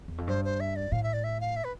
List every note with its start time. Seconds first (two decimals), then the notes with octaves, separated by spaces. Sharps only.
0.08 E2
0.18 F2
0.27 G2 C5
0.44 C5
0.60 E5
0.76 D5
0.92 A2 F5
1.03 E5
1.13 D5
1.24 E5
1.40 F5
1.56 E5
1.64 B4